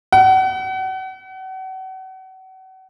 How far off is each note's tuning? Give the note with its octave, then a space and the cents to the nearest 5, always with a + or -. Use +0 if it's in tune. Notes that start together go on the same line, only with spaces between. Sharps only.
F#5 +35